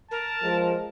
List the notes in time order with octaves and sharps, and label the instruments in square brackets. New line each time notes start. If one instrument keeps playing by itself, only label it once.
[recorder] A#4 [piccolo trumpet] A5
[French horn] F3 [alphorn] G#3